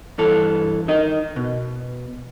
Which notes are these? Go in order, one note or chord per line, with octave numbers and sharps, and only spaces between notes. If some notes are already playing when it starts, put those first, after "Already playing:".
G2 E3 A4
D#4 A#4 D#5
B2